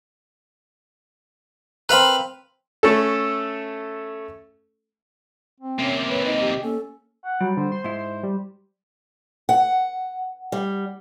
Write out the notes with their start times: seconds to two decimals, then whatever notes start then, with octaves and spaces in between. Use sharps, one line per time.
1.89 C4 A#4 B4 F5 B5
2.83 A3 C#4 A4
5.60 C4
5.79 C3 A#3 C#4
6.09 B4 C#5
6.26 D#4 D#5
6.41 G4
6.63 A#3 C#4 A4
7.25 F#5
7.41 F#3 G3
7.57 D3 C5
7.72 C6
7.84 G#2 E4
8.23 G3
9.49 F#5
10.52 G3